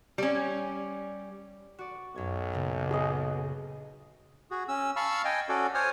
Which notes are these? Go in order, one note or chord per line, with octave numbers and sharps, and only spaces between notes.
G3 C#4
F#4 D5
B1 F#2 G#6
A#2 C#3
G#4 D#5
F#4 G#4
C#4 E6
F5 A5 B5 C#6 E6 F6
D#5 G5 G#5
C#4 F#4 A4 D5
C5 C#5 G#5 D#6 F6